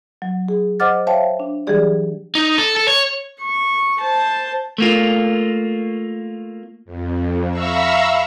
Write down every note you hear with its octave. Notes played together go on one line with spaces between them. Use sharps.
F#3
G#4
C5 D#5 F#5 D6 F6 A6
C5 C#5 E5 F5 G5 A5
D4
E3 F#3 G3 G4 G#4 D5
D#4
A4
A4
C#5
C#6
C5 A5
A3 A#3 F4
F2
E5 F5 A#5 B5 C#6 E6